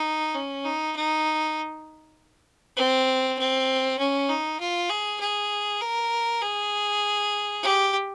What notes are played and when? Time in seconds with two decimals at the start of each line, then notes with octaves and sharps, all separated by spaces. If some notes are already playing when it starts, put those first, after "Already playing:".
Already playing: D#4
0.34 C#4
0.65 D#4
0.96 D#4
2.77 C4
3.38 C4
3.98 C#4
4.29 D#4
4.60 F4
4.90 G#4
5.20 G#4
5.81 A#4
6.42 G#4
7.63 G4